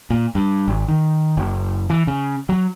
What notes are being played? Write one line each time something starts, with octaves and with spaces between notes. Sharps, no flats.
A#2
G2
G#1
D#3
F#1
E3
C#3
F#3